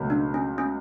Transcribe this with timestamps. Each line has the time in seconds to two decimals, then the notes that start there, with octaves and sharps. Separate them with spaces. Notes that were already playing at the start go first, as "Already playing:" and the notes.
Already playing: C#2 B2 F#3 A3
0.10 D4
0.34 C#4
0.58 C#4